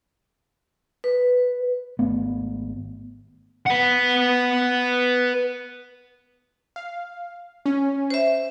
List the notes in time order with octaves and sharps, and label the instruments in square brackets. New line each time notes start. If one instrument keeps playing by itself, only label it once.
[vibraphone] B4
[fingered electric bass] G#1 A3 B3
[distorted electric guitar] B4 F#5
[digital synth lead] F5
C#4
[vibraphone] C5 E5